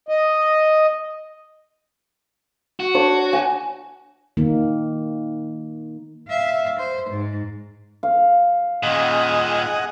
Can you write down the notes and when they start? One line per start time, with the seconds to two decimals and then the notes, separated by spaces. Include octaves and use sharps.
0.09 D#5
2.80 F#4
2.94 D4 C#5 D6
3.33 G#5
4.37 D#3 A#3
6.28 E5 F5
6.80 C5
7.10 G#2
8.03 F5
8.83 A#2 D#3 G#4 D#5 F#5